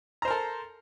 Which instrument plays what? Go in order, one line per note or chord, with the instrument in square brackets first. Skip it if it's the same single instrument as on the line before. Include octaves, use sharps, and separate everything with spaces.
[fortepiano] A#5
C5
A#4
A4